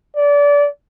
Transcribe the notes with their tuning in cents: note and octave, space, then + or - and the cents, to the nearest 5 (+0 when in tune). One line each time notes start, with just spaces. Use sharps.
D5 -25